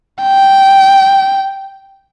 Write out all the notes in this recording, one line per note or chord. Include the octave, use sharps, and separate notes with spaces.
G5